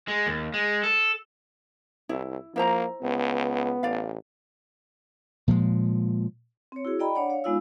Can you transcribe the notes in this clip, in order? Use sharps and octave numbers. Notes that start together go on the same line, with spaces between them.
G#3
D#2
G#3
A4
C2 E4
F3 A#3 E4 C5 A#5
C#2 B3
A1 D5 F5
A#2 F3 G#3
C4 C#5
E4 F#4 G#4
D5 D#5 G5 A#5 B5
D4 C#5 D5 F#5
C#5 F5
G#3 B3 D#4 F4 F5 E6